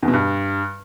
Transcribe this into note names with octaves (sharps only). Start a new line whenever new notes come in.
E2
B2
G2